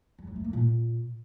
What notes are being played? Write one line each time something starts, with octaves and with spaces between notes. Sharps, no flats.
G3
F#3
A3
A#3
A#2